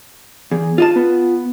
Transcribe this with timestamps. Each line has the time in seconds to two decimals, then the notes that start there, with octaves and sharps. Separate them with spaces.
0.51 E2 G#4
0.78 F4 D#5 A5
0.96 B3